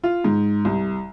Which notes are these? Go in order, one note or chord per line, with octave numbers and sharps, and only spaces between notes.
F4
G#2
C2